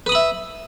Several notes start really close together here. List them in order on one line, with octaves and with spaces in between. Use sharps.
B4 D#6 B5 E5